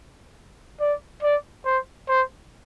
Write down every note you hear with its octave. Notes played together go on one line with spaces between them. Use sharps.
D5
D5
C5
C5